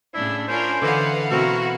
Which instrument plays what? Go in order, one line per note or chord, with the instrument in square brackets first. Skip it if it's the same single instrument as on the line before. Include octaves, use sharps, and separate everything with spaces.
[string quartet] A2 C#3 [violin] D4 [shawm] E4
[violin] C#4 D4 [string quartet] F4 A#4 B5 [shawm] C5
[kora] D3 E3 D#5 [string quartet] A4 F5 B5 [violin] B4 F#5
[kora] B2 C4 [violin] E4 F#4 [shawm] A#4